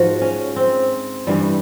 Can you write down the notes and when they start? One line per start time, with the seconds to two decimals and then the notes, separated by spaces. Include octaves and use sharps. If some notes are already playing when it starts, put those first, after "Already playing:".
Already playing: G#2 F3 F#4
0.21 C#4
0.56 C4
1.27 G2 E3 G3